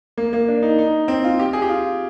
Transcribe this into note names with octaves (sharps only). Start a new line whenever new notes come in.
A#3
A#3
D4
D#4
D#4
C4
F4
G4
G#4
G4
F4